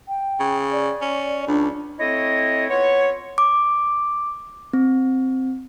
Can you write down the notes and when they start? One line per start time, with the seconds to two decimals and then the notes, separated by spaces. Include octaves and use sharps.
0.08 G5
0.40 C#3
0.72 D5
1.01 C#4
1.47 C#2 D4
1.99 A3 C4 E4 C#5 D#5
2.70 B3 F4 C#5
3.38 D6
4.73 C4